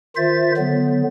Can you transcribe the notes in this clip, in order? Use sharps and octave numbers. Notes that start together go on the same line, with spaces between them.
D#3 F4 C5 E5 A6
D3 F#3 B3